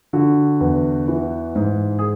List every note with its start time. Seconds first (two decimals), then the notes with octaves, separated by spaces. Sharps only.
0.13 D3 F#4
0.61 E2
1.08 E3
1.56 G#2
1.99 G#4